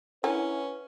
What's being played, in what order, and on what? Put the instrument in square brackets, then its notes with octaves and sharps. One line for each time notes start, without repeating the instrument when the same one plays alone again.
[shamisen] D3 A#4 G#5 [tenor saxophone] C#4 [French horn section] E4 [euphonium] B4